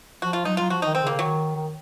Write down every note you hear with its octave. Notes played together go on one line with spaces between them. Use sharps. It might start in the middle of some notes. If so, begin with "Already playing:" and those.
F3 F#4
F4
F#3 D#4
F#3 F4
F3 F#4
D#3 D#4
D#3 C4
C#3
A#3
C#3
D#3 F#3
D#3